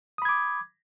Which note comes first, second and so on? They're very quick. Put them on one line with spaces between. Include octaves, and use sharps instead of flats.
D#6 B5 G#6 D6